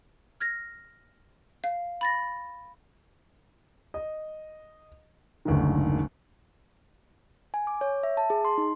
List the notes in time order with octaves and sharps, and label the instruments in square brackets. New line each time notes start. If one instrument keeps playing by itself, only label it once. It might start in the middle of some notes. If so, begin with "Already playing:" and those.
[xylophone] F6 G#6 A#6
F5
B5 A6 A#6
[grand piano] D#5
F#1 D2 G#2 D#3
[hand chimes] G#5
D6
C#5
E5
A5
G#4
C6
D#4